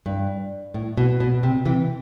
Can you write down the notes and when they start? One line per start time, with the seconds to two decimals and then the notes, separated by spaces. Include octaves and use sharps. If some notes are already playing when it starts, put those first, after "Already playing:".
0.06 G2
0.74 A2
0.97 B2
1.20 B2
1.43 C3
1.65 C3 E3